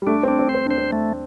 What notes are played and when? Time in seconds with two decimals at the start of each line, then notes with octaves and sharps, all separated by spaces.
0.02 G3
0.07 A3 D4
0.23 C4
0.28 D4
0.39 C4
0.49 C5
0.55 C4
0.66 D4 C5
0.78 C4
0.92 A3